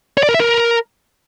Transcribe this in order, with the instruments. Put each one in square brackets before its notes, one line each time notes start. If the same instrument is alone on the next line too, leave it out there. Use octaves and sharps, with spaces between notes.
[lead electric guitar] C#5
D5
A#4
E5
A#4